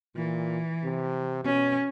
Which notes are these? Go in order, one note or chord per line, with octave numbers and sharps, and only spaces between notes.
A#2 E3
C3
B2 C#4